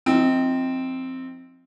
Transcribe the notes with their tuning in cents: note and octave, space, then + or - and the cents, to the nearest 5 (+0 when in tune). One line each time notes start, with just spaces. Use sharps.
F3 +0 C4 +0 D#4 +25